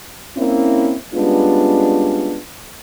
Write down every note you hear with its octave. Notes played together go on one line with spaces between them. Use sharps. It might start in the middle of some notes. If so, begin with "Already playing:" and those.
A#3 C4 C#4 E4
G3 G#3 B3 C#4 D4 F4